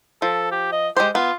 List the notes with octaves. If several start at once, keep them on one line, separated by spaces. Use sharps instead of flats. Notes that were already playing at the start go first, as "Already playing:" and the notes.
F3 A4
G4
D#5
G#3 G4 C5
B3 F4